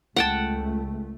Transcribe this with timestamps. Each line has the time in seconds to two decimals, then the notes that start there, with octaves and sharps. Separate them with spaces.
0.16 C#2 A3 F#5 G5 A5